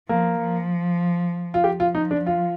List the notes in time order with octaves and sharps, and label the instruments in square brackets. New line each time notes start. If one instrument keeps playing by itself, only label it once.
[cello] F3 [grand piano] A#3
[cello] F3
[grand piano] F4
[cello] F3 [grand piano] G4
[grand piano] F4
D#4
D4
F4